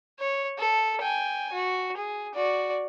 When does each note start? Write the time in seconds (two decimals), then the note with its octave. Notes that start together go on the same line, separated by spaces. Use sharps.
0.19 C#5
0.58 A4
1.01 G5 G#5
1.52 F#4
1.97 G#4
2.35 F#4 D5